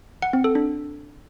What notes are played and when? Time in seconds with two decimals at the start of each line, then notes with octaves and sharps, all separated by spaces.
0.22 F#5
0.33 C4
0.44 A4
0.55 D4